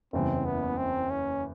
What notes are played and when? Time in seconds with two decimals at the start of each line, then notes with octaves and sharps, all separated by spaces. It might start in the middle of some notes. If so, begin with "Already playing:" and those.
0.13 F#1 E2 C#3 E3 G3 C4
0.46 B3
0.77 C4
1.10 C#4